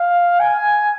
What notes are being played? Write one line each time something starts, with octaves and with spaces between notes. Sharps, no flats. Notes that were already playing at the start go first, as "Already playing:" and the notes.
Already playing: F5
G#5